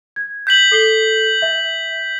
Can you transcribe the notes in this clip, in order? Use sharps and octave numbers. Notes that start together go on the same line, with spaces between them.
G#6
G6 B6 F#7
A4 C7 G7
E5